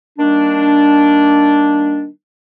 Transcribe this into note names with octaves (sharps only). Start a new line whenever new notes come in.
D#3 G3 A#3 D4